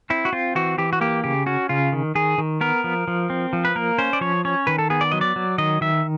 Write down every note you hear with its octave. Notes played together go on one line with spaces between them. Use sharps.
C4 E4
F#4
C4 F4
E3 F#4
E3 G4
F#4
A#3 G4
C#3 G4
C#4 F#4
C#3 F4
D#3
D#3 G#4
D#3
B3 A#4
F3
F3
C4
F3
B4
A#3 A#4
C#4 C5
D5
F3 C#5
C#4 C#5
D#3 B4
A4
B3 G#4
D5
F#3 D#5
D5
F#3
D#3 D#5
D#3 E5